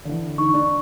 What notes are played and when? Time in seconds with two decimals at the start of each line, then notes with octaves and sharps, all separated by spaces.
0.05 D3 E3
0.38 D#4 C#6
0.54 D4